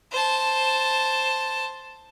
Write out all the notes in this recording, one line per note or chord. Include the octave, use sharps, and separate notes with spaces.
C5 A5